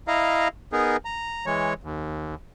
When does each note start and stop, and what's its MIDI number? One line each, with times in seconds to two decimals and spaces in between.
0.08 0.48 64
0.08 0.48 75
0.08 0.48 77
0.08 0.48 82
0.73 0.97 59
0.73 0.97 63
0.73 0.97 68
0.73 0.97 70
1.05 1.46 82
1.46 1.74 52
1.46 1.74 56
1.46 1.74 73
1.83 2.35 39